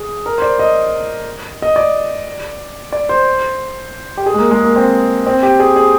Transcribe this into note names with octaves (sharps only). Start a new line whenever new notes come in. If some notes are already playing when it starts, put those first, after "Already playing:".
Already playing: G#4
A#4
C5
D5
D#5
D#5
D5
D5
C5
G4
G#4
G#3
A#3
G#3
A#3
C4
C4
G4
G#4
G#4